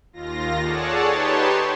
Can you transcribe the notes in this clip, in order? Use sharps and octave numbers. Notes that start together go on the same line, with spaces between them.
D#2 F4 A#6
G#4 A4 C#5 D5 F#5 A5
D#4 G4 B4 C#5 A5 C6